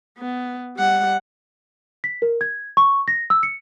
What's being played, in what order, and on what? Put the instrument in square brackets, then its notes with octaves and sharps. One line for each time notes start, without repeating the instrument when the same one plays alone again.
[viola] B3
G3 F#5
[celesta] B6
A#4
G#6
C#6
A#6
E6
C#7